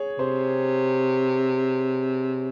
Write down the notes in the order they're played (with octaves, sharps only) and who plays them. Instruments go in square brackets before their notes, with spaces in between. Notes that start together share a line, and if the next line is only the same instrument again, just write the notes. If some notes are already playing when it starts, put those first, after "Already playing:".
Already playing: [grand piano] G#4 C#5
[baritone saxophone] C3 [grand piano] C5